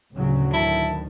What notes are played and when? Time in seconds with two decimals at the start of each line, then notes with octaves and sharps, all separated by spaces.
0.14 D2 A2 C#3 F#3
0.53 D#3 E4 A5